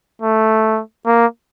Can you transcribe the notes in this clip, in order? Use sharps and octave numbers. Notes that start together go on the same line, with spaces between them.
A3
A#3